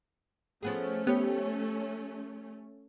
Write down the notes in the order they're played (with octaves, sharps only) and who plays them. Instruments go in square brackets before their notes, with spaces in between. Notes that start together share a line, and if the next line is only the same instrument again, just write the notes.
[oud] F3 B3 G#4 [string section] A3 C#4
[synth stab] B3 [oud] G4 C#5